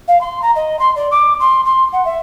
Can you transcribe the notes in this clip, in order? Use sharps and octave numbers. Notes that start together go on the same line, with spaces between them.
F5
C6
A#5
D#5
C6
D5
D6
C6
C6
F#5
E5